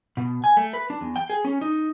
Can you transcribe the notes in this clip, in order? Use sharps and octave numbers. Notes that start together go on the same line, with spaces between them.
B2
G#5
A3
B4
D4
E2
G5
G#4
C#4
D#4